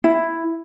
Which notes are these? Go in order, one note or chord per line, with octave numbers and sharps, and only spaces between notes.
E4